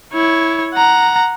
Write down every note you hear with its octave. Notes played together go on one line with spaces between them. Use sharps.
E4 C#5
F#5 A#5